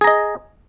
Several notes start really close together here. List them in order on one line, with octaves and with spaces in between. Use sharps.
G#4 A#5 D#5